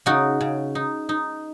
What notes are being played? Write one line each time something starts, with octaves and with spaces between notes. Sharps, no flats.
C#3 D#4 F#4
C#3
D#4
D#4